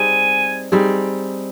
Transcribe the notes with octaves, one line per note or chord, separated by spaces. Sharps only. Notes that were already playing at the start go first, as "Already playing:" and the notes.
Already playing: G3 C4 D#4 G#4 G#5
G3 C4 D#4 G#4